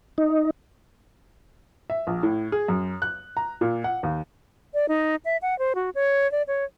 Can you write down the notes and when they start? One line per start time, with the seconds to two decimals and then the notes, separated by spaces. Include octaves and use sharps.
0.18 D#4
1.90 E5
2.07 A#1
2.23 A2
2.52 G#4
2.68 F#2
3.02 F#6
3.37 A#5
3.61 A#2
3.84 F#5
4.03 D#2
4.74 D5
4.89 D#4
5.25 E5
5.42 F#5
5.59 C5
5.75 F#4
5.95 C#5
6.32 D5
6.48 C#5